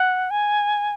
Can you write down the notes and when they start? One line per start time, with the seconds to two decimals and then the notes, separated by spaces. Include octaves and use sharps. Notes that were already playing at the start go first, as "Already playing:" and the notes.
Already playing: F#5
0.31 G#5